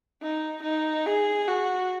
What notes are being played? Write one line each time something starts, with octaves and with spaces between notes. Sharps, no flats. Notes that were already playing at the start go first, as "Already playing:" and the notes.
D#4
D#4
G#4
F#4